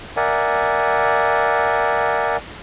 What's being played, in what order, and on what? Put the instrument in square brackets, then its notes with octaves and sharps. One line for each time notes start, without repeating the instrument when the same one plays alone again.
[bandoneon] A#4 D5 E5 F#5 G#5